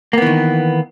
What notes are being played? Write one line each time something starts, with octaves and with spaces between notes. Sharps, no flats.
D#3 E3 A#3 B3